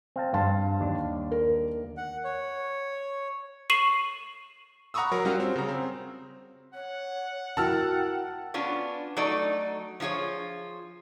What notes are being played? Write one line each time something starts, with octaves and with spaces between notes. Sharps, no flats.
C4 F5 A5
G2 F5 A5 C6
D#2 D4
A#4
F#5
C#5
C#6 C7 D#7 E7 F#7
F#5 A#5 B5 C#6 D#6 E6
F#3 A#4
G3 C#4 F4 F#4
C4
C#3 A#5
C4
C#5 F#5
E4 F#4 A#4 G5 A5 E6 F6
B3 C#4 D4 F4
F#3 A3 D#4 D5
F3 D#4 F4 G#4 C#5